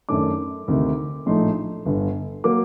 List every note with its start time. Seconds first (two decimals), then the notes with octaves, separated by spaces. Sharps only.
0.09 F#2 D#3 A3 D4 D6
0.68 D2 C3 D#3
1.26 A#1 A2 A3 D#4 C6
1.86 G1 G2 D3
2.44 F#3 A#3 D6